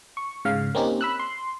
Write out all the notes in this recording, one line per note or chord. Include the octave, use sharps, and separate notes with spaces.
C#6
G#2 C#3 F5
A#3 C4 C#4 D#4 G4
B5 E6 F#6
C6